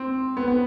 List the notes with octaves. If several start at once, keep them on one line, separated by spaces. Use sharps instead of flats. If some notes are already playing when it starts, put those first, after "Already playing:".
Already playing: C4
B3
B3